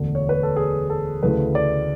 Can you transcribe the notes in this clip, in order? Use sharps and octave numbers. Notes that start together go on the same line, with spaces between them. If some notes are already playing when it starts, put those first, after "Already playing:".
Already playing: E1 D2 D3
C#5
B4
A4
G#4
A4
D2 C#3 E3 A3 B4
D5